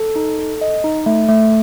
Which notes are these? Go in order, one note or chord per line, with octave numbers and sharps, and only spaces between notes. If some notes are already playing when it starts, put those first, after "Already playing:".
Already playing: A4
D#4
A4
D#5
D#4
A3
A3